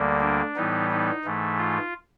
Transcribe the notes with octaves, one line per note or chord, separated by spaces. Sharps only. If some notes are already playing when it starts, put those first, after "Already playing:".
Already playing: D2 D3 G3 A#3
D4
A2 E3 G3 B3 D#4
D#4
G#2 E3 A3
F4